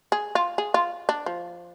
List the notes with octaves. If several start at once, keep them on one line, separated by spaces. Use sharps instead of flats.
G#4
F4
G#4
F4
D4
F3